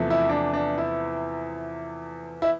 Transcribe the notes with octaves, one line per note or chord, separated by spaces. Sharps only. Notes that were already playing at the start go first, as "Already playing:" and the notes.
Already playing: E2 C3 F3 A3
E4
D4
D4
E4
E4